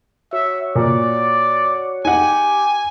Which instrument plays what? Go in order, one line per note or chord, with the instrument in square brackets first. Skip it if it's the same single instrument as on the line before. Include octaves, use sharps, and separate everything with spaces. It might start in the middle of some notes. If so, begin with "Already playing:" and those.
[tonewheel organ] F#4 C#5 [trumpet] E5
[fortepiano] A#2 [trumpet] D5
[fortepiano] D#4 F#5 [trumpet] G4 [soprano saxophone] G#5